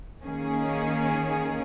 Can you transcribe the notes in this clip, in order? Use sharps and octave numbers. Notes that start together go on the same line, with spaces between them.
D#3 A#3 C#4 G#4